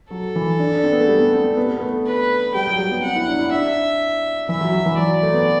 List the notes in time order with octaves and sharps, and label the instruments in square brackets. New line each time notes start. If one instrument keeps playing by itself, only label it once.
[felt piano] F#3 [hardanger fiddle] A4
[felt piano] E3
D4
D4
C4
B3
A3
G3
B3
C4
C4
B3
B3
A3
[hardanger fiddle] B4
[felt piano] G3 [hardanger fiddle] G5
[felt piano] F#3
G3
B3
[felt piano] C4 [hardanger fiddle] F#5
[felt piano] E4
D4
E4
[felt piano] D4 [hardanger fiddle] E5
[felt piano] E3 [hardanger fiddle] E5
[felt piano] F#3
F#3
E3
[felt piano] F#3 [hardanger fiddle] D5
[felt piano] A3
B3